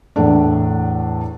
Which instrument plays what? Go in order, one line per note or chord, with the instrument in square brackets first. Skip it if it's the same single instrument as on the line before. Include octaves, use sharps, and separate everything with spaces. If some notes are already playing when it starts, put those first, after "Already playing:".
[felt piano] E2 A2 A3 D4